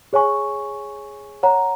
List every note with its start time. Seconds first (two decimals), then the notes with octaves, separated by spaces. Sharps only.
0.13 G#4 C#5 G#5 C#6
1.43 C#5 F#5 A#5